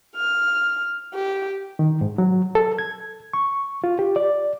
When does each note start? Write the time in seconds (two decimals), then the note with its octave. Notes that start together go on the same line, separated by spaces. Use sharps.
0.16 F6
1.14 G4
1.79 D#3
2.01 G#2
2.18 F#3
2.55 A4
2.79 G#6
3.34 C#6
3.84 F4
3.99 G4
4.16 D5